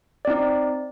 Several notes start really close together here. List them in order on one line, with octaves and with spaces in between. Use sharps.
D5 C4 D#4